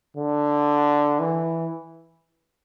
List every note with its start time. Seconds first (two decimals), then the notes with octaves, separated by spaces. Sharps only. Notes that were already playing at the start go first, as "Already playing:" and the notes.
0.17 D3
1.20 E3